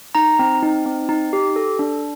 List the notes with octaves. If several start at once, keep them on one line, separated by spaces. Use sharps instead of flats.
D#4 A#5
C4
D#4
C4
D#4
G4
A4
D4